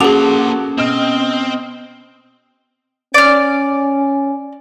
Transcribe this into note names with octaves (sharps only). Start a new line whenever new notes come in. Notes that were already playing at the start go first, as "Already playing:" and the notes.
A#3 C#4 F#4 G#4 A4 C5 D6 F7
B2 C4 D#5 F6
C#4 D5 F6